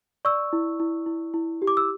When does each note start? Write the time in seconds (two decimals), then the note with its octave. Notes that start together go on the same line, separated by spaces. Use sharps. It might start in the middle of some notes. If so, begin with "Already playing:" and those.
0.25 D5 C#6 E6
0.53 E4
0.80 E4
1.06 E4
1.34 E4
1.62 G4
1.67 D6
1.77 E6